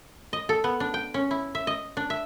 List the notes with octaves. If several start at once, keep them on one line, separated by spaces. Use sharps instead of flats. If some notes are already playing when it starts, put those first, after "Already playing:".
D#5
A4
B3
D4
G5
C#4
E4
E5
D#5
D4
E5